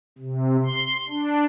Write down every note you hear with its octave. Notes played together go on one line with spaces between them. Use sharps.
C3
C6
D4